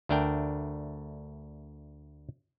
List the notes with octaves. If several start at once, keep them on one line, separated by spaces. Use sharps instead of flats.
D2 A3 D4 A#4 G5